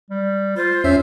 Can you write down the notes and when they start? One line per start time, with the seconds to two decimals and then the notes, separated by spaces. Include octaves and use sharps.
0.10 G3
0.57 F4 C5
0.84 E2 C#4 C#5 E5